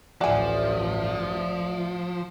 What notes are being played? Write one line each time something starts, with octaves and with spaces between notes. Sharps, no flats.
A1 D2 G2 F3 F#4 D5 E5 G#5